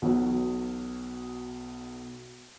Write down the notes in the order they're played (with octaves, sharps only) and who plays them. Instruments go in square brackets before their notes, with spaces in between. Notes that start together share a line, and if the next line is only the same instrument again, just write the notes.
[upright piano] B1 B2 F#3